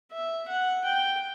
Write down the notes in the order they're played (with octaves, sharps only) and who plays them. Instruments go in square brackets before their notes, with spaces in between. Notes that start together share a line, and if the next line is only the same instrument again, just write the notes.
[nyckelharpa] E5
F#5
G5